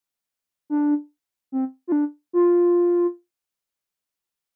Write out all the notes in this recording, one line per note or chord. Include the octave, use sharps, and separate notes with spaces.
D4
C4
F4
D4
F4